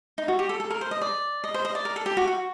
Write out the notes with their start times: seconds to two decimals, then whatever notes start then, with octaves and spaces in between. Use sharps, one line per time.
0.18 D#4
0.28 F#4
0.39 G4
0.49 A4
0.60 A4
0.71 A#4
0.81 C5
0.91 D#5
1.01 D5
1.44 D#5
1.54 C5
1.65 D#5
1.75 D5
1.85 A#4
1.96 A4
2.06 G4
2.17 F#4
2.28 F#4